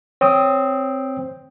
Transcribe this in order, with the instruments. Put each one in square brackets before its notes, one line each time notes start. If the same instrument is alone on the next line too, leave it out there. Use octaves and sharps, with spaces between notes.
[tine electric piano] C4 [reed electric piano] C#5 G5 D#6